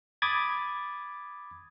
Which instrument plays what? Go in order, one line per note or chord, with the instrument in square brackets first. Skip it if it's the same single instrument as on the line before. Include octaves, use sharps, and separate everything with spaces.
[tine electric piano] B5 D6 D#6 G#6 A6